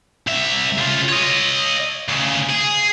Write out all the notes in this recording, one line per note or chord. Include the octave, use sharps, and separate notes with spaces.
C2 E5
C#3 F4
C#5 D#5
D2 C#3
G#4